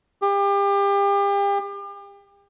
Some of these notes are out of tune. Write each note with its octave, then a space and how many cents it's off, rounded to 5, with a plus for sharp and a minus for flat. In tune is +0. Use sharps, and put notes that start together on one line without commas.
G4 +35